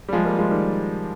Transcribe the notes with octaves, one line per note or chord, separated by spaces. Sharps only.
G3
F3 G#3
G3 A#3
F3 G#3
D#3 G3